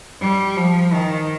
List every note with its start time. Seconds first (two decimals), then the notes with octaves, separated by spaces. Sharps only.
0.21 G3
0.57 F3
0.93 D#3